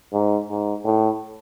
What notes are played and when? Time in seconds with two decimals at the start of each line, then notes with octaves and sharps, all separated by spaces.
0.13 G#2
0.49 G#2
0.84 A2